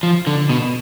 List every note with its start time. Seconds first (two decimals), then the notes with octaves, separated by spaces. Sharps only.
0.03 F3
0.27 D3
0.50 B2